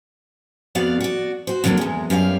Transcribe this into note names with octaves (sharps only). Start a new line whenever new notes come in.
F2 B3 F#4 D5 F5
F#4 D5
F#4 C5
F2 D3 F#3 G3 A#3 D4
E2 G#3
F#2 G3 A#4 F5